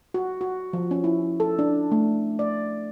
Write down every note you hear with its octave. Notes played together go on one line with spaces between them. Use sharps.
F#4
F#4
F3
C#4
E4
A4
D4
A3
D5